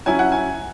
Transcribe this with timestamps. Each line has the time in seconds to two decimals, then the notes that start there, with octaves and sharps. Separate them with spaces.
0.06 F#3 C#4 E4 G#5
0.19 F#5
0.32 G#5